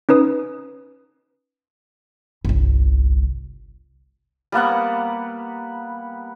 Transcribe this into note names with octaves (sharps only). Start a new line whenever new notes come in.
C#4 D#4 B4 D#6
G1 C2
G3 A#3 B3 F#5